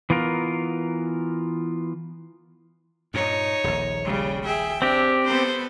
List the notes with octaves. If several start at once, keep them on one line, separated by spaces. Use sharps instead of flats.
E3 B3 F4 A#4
G2 A#2 D#4 C#5
D#1 A#1
C#3 G3
G#4 E5 G5
C4 D4 G4
B3 A4 C5